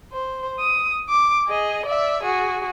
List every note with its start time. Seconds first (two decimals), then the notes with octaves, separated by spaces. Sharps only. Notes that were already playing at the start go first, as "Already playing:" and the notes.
0.12 C5
0.59 D#6
1.09 D6
1.48 G#4 D#5
1.86 D5 E5
2.23 F#4 G#4